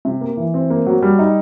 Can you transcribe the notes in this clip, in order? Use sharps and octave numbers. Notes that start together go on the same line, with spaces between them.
C3
A#3
E3
C4
A#3
F#3
G3
D#4